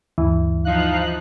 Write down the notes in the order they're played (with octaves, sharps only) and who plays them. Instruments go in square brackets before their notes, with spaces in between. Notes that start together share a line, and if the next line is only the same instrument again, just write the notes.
[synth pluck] D2 G2 [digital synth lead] E3
[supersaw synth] F3 D#4 F#6 [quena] F5